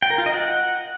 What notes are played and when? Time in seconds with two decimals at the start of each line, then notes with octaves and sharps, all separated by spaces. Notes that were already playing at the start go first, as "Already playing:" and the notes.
0.02 G5
0.10 A#4
0.18 F4
0.26 D#5
0.34 F#5